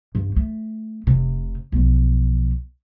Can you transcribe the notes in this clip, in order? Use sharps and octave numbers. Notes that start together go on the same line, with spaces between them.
G2
A3
F1 C3
B1 F3